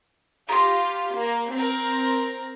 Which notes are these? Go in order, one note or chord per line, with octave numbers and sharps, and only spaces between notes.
F4 G4 A#5 C6
A#3
C4 A#4